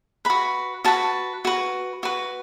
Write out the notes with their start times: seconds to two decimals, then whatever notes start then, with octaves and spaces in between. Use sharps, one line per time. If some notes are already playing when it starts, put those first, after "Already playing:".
0.25 F#4 B4 B5
0.85 F#4 B4 A5
1.45 F#4 B4
2.03 F#4 B4